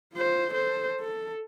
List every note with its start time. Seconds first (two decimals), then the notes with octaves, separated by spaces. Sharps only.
0.13 F4 C5
0.52 A4 C5
1.01 A4